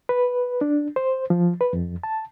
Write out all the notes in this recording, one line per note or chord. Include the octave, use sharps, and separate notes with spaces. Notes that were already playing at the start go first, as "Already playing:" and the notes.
B4
D4
C5
F3
B4
F2
A5